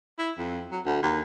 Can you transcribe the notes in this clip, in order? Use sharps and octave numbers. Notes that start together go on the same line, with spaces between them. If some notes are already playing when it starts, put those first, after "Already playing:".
E4
F2
F#3
D2
D#2